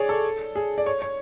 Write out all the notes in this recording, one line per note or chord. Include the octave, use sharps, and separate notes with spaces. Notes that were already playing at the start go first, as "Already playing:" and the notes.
Already playing: G#4 C#5 D5
A4
G#4
D5
C#5
C#5